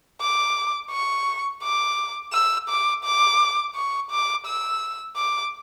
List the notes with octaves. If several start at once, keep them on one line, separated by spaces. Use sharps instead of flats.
D6
C#6
D6
E6
D6
D6
C#6
D6
E6
D6